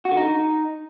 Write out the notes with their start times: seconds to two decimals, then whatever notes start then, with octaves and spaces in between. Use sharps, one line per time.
0.05 F#4
0.11 D3
0.17 D#4